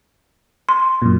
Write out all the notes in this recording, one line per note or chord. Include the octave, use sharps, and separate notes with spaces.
C6
F#2 A#2